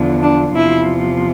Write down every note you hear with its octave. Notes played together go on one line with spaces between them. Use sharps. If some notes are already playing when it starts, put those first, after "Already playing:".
Already playing: E2 D3 F3
D4
E2 C3 F3 E4